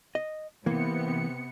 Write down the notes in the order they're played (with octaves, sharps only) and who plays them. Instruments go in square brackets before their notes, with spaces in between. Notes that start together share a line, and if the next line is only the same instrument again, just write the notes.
[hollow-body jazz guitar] D#5
[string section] C3 B3 C#7 [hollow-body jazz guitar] E3 A#3